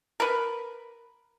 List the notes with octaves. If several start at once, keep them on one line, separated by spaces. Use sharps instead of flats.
A#4 B4